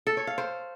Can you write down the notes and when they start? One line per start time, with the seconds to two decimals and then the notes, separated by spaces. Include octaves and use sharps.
0.07 A4
0.17 C#5
0.27 F5
0.38 C5